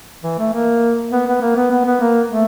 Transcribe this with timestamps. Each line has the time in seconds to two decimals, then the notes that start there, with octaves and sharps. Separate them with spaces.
0.23 E3
0.39 A3
0.53 A#3
1.12 B3
1.27 B3
1.41 A#3
1.56 B3
1.71 B3
1.86 B3
2.01 A#3
2.30 A3